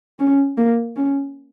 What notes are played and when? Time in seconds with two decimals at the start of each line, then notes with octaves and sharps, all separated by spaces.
0.19 C#4
0.57 A#3
0.96 C#4